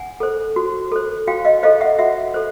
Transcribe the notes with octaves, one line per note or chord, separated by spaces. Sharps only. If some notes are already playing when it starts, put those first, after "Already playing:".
Already playing: F#5 G#5
A4 C5
F#4
A4 C5
F#4 F5 G5
D#5 F5
A4 C5 D#5 F5
E5 F#5
F#4 E5 F#5
A4 C5